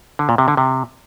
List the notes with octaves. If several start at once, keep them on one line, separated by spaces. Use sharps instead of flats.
D3
A#2
C3
D3
C3